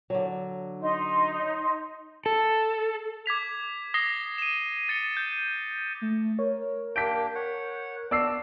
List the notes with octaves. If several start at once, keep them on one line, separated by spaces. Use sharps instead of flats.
D3 F#3
D#4 C6
A4
D6 G#6 B6 F7
D#6 A#6 C7 G7
D#7 E7
A6 C#7 D#7 G7
G6
A3
A#4 C#5
A#3 D4 G4 G6 B6 D7
C#5 F#5
B3 D4 F#4 D5 E6 C7